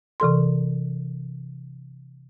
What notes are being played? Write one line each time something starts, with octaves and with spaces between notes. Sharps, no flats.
C3 E3 A4 C6